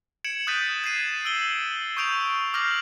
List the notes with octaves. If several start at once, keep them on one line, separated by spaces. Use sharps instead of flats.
G#6 C#7 D7 E7 F#7
D#6 F#6 G6 A6 B6 D#7
G#6 B6 C7 D#7 E7
E6 D7 F#7 G7
C#6 D#6 G6 D7 F7
D6 F6 G6 A#6 C7 F#7